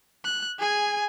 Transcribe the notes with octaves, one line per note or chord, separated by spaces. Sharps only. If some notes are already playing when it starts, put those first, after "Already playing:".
F#6
G#4 G#5